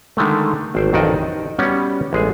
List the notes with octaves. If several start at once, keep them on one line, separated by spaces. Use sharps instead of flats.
D3 D#3 G#3 A3
G#1 C5 G5
A1 F2 D#3 F#4 D5 D#5
D#4
G3 B3 C#4 F#4 C#5 F#5
A1 G#3 G#4